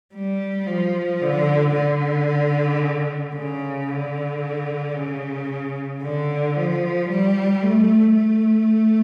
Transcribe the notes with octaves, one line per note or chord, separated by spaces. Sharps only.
G3
F3
D3
D3
C#3
D3
C#3
D3
F3
G3
A3
A3